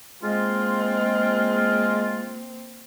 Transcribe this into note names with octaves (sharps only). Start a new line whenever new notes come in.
G#3 A#3 C4 F4